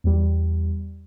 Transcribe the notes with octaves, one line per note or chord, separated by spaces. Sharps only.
E2 G3